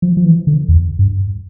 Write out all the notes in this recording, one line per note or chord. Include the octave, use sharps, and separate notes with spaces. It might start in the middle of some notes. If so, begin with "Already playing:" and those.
F3
F3
E3
D3
E2
G2